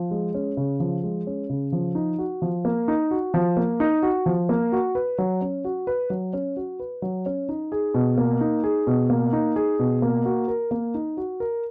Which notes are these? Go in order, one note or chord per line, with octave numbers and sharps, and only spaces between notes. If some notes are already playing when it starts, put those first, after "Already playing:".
Already playing: F3
G#3
C#4
C#3
F3
G#3
C#4
C#3
F3
D#4
F#4
F3
A#3
D#4
F#4
F3
A#3
D#4
F#4
F3
A#3
F#4
B4
F#3
C#4
F#4
B4
F#3
C#4
F#4
B4
F#3
C#4
D#4
G#4
B2
A#3
D#4
G#4
B2
A#3
D#4
G#4
B2
A#3
F#4
A#4
A#3
D#4
F#4
A#4